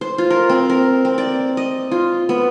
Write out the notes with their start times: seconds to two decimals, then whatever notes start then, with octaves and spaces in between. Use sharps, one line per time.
0.01 C5
0.18 F4
0.30 A#4
0.49 C4
0.70 A#4
1.05 C4
1.18 D5
1.57 D#5
1.91 F4
2.29 B3